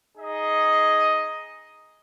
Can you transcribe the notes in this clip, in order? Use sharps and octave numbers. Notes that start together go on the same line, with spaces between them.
D#4 G#4 D#5